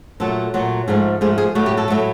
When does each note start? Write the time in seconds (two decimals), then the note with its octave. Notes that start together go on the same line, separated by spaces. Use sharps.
0.20 A#2 F#3 A3 A4
0.54 A#2 F#3 A3
0.88 G#2 F3 A3 G#4
1.21 G#2 F3 A3 G#4
1.38 G#4
1.55 A2 F#3 A3 F#4
1.66 G4
1.77 A4
1.88 A2 F#3 A3